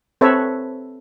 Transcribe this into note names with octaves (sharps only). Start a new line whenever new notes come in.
C4 A4 B4 C#5 E5